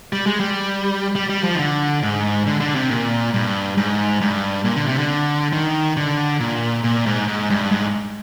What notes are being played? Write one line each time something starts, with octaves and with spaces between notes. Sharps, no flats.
G3
G#3
G3
G3
G3
F3
D#3
D3
G#2
D3
D3
C3
A#2
G2
G#2
G2
A#2
D3
C3
D3
D#3
D3
A#2
A#2
G#2
G#2
G2
G#2